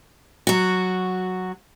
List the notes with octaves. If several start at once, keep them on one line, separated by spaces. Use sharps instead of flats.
F#3 F#4